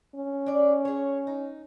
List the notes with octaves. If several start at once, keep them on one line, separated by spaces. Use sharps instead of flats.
C#4
D4 D5
G#4 C#5
D#4